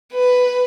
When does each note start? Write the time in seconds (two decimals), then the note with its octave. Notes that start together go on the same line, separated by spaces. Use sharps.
0.14 B4